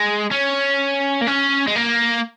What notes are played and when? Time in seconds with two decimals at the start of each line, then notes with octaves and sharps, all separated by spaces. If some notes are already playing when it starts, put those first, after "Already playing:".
Already playing: G#3
0.31 C#4
1.22 A#3
1.27 C#4
1.68 G#3
1.76 A#3